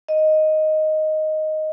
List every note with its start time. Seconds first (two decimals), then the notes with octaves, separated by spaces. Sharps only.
0.09 D#5